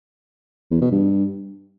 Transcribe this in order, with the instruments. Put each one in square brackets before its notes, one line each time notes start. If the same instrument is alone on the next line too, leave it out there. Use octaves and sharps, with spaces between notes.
[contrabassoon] E2
B2
G2